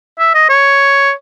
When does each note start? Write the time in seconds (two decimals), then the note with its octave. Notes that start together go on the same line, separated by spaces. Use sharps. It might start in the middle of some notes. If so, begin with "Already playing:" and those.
0.19 E5
0.34 D#5
0.49 C#5